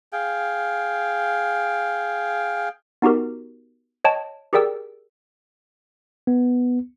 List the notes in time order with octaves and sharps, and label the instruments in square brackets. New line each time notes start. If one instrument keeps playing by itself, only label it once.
[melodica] G#4 F5 G5
[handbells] B3 D#4 F#4 G4 A#4
C#5 D#5 G5 A5
G4 G#4 A#4 D5 G5 E6
[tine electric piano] B3